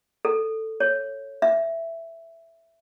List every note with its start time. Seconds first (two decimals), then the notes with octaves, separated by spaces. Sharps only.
0.25 A4
0.80 C#5
1.42 E5